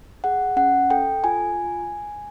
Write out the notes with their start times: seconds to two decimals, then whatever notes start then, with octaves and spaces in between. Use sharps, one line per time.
0.24 G#4 F#5
0.56 C#4 F#5
0.90 A4 G5
1.24 F4 G#5